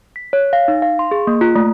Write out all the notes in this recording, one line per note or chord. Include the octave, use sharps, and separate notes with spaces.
B6
C#5
F5
D#4
F5
C6
G#4
A#3
F4
A3